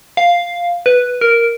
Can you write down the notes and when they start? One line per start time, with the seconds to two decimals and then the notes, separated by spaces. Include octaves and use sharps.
0.17 F5
0.86 B4
1.21 A#4